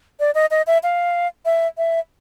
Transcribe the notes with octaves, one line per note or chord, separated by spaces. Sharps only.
D5
D#5
D#5
E5
F5
E5
E5